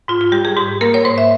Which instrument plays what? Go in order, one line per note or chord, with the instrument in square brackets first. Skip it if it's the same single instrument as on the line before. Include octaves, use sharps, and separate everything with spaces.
[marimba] G#2 F4
F4
G3 G4
G#4
G#2 G4
A#3 A#4
C#5
G#2 C5
E5